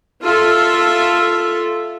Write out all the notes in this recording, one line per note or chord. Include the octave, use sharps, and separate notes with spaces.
F4 A4 E5